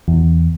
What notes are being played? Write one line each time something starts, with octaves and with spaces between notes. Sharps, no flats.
E2